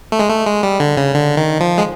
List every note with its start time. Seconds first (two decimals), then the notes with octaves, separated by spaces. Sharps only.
0.12 A3
0.19 G#3
0.29 A3
0.46 G#3
0.63 G3
0.80 D3
0.97 C#3
1.15 D3
1.37 D#3
1.60 F3
1.78 G#3